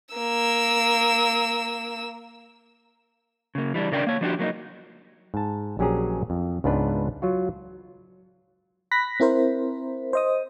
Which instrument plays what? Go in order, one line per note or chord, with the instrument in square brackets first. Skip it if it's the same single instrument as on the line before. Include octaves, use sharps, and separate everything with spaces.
[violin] A#3 E6
[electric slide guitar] C#3 A#3
E3 G3 D4
C#3 D4 A#4 D5 G5
A#3 C#5
F3 D4 F#4 G4
F#3 A#3 C4 D#4
[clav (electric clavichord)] G#2 A5
A#1 F#3 C#4 G4 G#4 A#5
F2
C#2 G#2 B3 D4 B4
F#3 F4 F#4
[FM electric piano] B5 F#6 A#6 B6
C4 E4 A#4 C5
C5 D#5 D#6